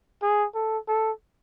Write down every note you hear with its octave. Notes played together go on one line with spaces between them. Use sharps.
G#4
A4
A4